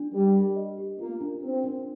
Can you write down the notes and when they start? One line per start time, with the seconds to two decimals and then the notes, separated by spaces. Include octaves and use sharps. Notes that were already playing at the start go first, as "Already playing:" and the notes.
Already playing: D4
0.12 G3 A#4
0.35 G4
0.55 D#5
0.78 G4
0.99 A#3 F4
1.21 D4
1.42 C4 A#4
1.64 D4